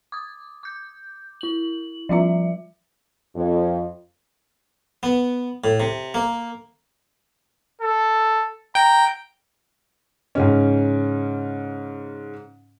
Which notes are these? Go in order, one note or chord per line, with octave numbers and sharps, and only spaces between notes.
D6 D#6
D6 G6
E4 F#7
F3 G3 F4 E5
F2
B3
A2
C3
A#3
A4
G5 A#5
G#2 C#3 C#4